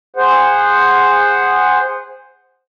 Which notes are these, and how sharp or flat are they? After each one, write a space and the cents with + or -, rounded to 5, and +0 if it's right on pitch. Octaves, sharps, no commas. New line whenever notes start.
G#4 -20 C5 +0 F#5 +0